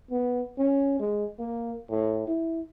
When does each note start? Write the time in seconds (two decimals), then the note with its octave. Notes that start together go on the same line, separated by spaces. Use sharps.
0.11 B3
0.58 C#4
1.00 G#3
1.39 A#3
1.90 A2
2.27 E4